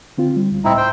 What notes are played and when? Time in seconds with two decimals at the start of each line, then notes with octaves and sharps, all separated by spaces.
0.18 D3 C4 F4
0.36 G3
0.51 C#2
0.65 C#2 A2 C4 D#4 E4 E6
0.78 C5 G5